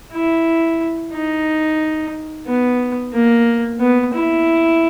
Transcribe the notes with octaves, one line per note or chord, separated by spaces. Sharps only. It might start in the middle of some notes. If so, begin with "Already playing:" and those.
E4
D#4
B3
A#3
B3
E4